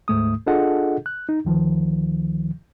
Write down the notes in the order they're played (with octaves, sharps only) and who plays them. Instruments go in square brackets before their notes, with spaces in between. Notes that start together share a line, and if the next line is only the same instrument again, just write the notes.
[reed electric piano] D2 G#2 A3 D#6
D4 F4 G#4 A4 D#5 F#5
F#6
D#4
D2 D#3 F3